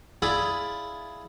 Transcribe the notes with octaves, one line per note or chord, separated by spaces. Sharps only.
E4 F4 G#4 D5 E5 G#5